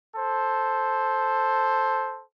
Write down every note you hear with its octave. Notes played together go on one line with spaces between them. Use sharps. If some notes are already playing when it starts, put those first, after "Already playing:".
A4 C5